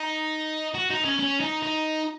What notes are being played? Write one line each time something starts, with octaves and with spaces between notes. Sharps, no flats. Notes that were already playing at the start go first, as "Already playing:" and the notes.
Already playing: D#4
F#4
D#4
C#4
C#4
D#4
D#4